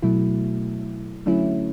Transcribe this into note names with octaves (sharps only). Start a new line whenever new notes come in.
B2 F#3 A3 E4
D3 F#3 A3 C#4 E4